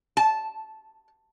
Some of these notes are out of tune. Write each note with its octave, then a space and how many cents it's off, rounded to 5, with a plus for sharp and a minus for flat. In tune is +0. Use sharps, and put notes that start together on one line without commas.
A5 -10